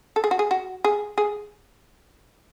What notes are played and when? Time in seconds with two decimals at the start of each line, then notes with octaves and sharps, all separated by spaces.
0.16 A4
0.24 G#4
0.31 F#4
0.39 G#4
0.51 F#4
0.84 G#4
1.18 G#4